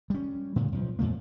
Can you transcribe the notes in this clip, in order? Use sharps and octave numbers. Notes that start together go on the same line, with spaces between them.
G3 C#4
A2 C#3 G3 G#3
B1 F3
F2 A#2 A3 A#3